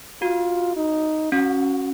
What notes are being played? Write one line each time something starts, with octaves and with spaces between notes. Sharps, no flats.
F4 F#4
D#4
C#4 F#4